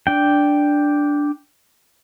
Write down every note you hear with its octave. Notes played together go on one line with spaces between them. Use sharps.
D4 G5